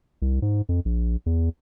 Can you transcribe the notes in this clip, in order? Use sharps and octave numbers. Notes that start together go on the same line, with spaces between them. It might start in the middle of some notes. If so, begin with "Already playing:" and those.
C2
G#2
F2
A#1
E2